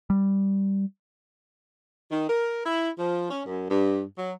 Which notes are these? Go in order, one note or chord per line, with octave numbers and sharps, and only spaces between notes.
G3
D#3
A#4
E4
F3
C#4
F#2
G2
F#3